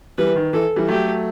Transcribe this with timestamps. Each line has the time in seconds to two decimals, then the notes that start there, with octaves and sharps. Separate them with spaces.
0.18 E3 G3 B4
0.36 D#3
0.53 E3 A4
0.76 E3 G3
0.88 F#3 A3 G4